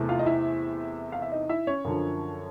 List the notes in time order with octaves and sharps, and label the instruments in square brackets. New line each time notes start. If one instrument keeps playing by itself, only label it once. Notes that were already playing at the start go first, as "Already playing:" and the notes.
Already playing: [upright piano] E2 C3 E3 A3
F4 F5
D#5
E4 E5
F5
E5
D#4 D#5
E4 E5
C#4 C#5
F#2 D3 F3